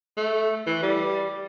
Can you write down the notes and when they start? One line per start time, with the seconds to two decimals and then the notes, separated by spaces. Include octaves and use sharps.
0.17 A3
0.66 E3
0.82 G3